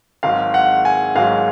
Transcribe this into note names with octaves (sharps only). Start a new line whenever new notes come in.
G#1 G#2 F#3 F5
F#5
G#5
G#1 G#2 F#3 F5